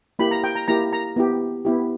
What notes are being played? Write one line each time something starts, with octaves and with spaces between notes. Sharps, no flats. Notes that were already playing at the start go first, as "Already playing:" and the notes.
A#3 E4 G4 B5
A#5
G5
A#5
A#3 E4 G4 A#5
A#5
B3 E4 G4
B3 E4 G4